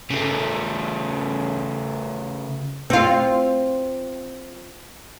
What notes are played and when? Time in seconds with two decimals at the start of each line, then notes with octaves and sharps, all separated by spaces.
0.11 C#3 A3
2.90 C4 F4